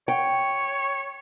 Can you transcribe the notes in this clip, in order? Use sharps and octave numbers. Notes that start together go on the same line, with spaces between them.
C#5 G5